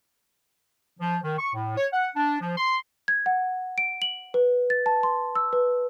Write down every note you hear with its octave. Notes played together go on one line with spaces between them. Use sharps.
F3
D#3
C#6
A2
C#5
F#5
D4
F3
C6
G#6
F#5
D7
F#7
B4
A6
A5
C6
E6
B4